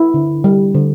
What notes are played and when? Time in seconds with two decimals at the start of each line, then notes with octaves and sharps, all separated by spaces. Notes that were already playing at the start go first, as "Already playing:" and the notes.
Already playing: E4
0.14 D3
0.44 G3
0.74 D3